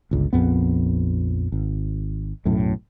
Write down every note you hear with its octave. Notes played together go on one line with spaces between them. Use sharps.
G1 C#2
A#1 F2 B3
G#1
B1 F#2 A2